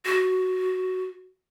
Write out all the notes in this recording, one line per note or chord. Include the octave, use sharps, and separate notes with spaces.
F#4